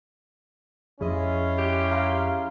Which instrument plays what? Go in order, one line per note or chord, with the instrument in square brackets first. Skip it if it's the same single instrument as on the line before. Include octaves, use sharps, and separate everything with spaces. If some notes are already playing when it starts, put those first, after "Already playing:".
[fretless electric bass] F2 F3 [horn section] C#4 E4 F4 [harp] G#4 D#5
[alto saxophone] G4
[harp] F5 A#5 C6